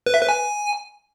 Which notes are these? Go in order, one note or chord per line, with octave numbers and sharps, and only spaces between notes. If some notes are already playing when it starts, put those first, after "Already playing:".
B4
E5
B4
G#5